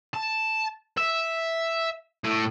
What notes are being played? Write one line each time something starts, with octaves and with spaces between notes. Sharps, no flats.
A5
E5
A2